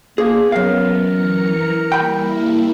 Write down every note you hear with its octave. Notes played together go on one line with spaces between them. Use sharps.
A#3 B3 G#4
F#2 A#4 F5
E3 A#5 C#7
G3 A#3 E4 G5 B5